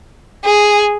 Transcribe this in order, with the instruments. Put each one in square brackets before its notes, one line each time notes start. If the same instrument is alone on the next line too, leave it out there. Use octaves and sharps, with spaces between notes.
[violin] G#4